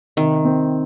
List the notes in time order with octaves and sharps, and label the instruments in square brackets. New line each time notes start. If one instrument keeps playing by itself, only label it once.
[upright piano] C3 [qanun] D#3
[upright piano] C4